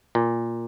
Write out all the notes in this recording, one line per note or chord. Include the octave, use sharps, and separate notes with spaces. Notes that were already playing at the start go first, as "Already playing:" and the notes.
A#2